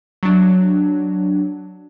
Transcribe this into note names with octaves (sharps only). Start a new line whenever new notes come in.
F#3 D4